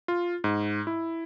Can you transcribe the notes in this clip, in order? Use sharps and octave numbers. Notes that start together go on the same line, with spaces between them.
F4
G#2
E4